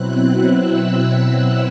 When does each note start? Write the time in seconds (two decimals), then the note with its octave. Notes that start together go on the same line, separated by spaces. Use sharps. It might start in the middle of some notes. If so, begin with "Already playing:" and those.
Already playing: B2 F#3 C4 E4 F#6
0.55 E6